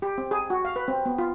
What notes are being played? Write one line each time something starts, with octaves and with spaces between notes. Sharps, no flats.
G4
C4
G#4
F#4
F5
B4
C4
B3
F4